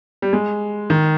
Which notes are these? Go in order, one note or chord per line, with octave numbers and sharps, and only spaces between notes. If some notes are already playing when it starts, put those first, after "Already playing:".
G3
G#3
D#3